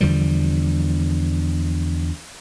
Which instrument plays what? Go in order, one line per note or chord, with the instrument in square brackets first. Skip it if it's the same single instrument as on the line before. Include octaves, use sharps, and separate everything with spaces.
[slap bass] E2 D3 F3 G3